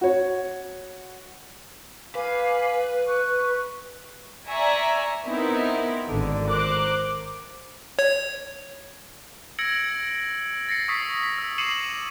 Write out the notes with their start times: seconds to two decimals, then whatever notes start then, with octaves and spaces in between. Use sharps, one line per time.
0.01 F#4 C#5
2.15 B4 F5 G#5 D6
3.07 C#6 F#6
4.49 D5 E5 G#5 A#5 C#6
5.26 B3 C4 D#4 E4 A#4
6.10 G#1 D3
6.47 A#4 C5 D6 F#6
7.99 C#5
9.59 E6 G#6 A#6 C#7 D7 F#7
10.69 A6 A#6 C7 C#7
10.88 C#6 D#6 E6 B6 C7
11.23 B6
11.38 E6
11.58 D6 C7 C#7 D#7 E7 F#7